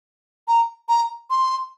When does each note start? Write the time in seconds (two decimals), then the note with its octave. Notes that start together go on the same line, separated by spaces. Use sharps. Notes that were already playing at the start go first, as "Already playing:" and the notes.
0.48 A#5
0.89 A#5
1.30 C6